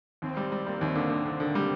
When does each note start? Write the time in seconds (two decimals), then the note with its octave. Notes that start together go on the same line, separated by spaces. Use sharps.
0.22 D#2 C4
0.37 G3
0.52 G3
0.66 G3 A#3
0.81 D#2
0.96 D3
1.10 D3
1.25 D3
1.40 D3
1.55 G3